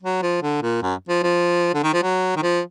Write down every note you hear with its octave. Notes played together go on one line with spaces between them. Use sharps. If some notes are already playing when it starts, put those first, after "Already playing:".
F#3
F3
D3
A#2
F#2
F3
F3
D3
D#3
F3
F#3
D#3
F3